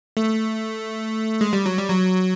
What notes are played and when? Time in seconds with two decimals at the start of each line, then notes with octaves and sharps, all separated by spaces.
0.17 A3
1.41 G#3
1.53 G3
1.66 F#3
1.78 G3
1.90 F#3